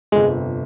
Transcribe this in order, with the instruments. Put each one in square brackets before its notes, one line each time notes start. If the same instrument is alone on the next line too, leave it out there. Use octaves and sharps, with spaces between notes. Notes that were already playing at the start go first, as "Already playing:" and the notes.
[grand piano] G1 F2 C3 [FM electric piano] G#3